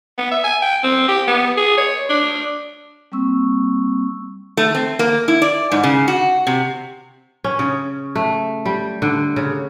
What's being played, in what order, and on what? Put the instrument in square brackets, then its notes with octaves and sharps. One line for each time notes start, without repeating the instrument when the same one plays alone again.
[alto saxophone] B3
E5
G#5
G5
C4
G4
B3
G#4
C#5
D4
[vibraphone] G3 A#3 C4 C#6 E6
[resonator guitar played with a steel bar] A3
C4
A#3
E4
D5
G#2
C#3
F#4
C3
[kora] C#4
C#3
A3
G3
D3
C#3